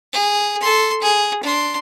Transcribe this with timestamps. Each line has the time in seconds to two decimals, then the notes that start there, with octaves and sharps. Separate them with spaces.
0.14 G#4
0.61 A4 C6
1.02 G#4
1.43 D4 C6